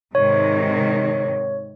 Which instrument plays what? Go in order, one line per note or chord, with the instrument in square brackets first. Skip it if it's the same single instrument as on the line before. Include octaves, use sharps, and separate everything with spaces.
[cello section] G#2 C3 D#3 [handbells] C#5